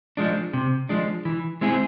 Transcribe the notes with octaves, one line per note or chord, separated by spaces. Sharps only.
F3 G#3 D4
C3
F3 G#3 D4
E3
G#3 C4 E4 G#4